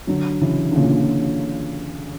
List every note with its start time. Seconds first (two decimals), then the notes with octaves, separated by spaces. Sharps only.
0.07 D3 F#3
0.41 C#3 E3
0.71 D3
0.76 A#2 C#3